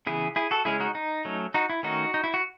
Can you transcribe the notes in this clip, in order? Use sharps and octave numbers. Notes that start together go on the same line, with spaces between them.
C#3 E3 B3 E4 G#4
E4 G#4
F#4 A4
C#3 G#3 C#4 E4 G#4
D#4 F#4
D#4
F#3 A3 C#4
D#4 F#4
E4
D#3 A3 C#4 D#4 F#4
D#4
E4
F#4